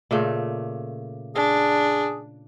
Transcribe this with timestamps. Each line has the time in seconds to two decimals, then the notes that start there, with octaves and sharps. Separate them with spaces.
0.11 A#2 C#3 A3
1.36 D4 G#4